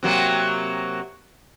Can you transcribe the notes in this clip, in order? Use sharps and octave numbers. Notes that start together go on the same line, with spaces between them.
C3 F#3 A#3